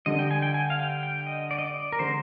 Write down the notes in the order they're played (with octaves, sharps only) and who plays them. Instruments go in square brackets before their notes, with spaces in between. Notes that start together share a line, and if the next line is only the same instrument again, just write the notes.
[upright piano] D3 G3 D4 [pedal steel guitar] D#5
[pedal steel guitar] G5
G#5
G5
G#5
F5
G5
G5
D#5
D5
D#5
D5
A#4
[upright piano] D3 G#3 [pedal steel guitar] C5